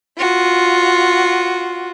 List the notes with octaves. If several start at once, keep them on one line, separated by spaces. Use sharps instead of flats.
F4 F#4